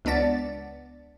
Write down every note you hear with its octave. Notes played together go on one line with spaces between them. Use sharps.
C#2 B3 D4 D5 A6